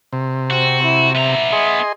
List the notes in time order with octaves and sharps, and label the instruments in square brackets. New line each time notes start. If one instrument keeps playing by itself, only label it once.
[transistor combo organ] C3
[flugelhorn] C4 [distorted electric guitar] F#4
[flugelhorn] E4
[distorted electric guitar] B3 A#5 [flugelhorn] E5
[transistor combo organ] G#4 D#5 C6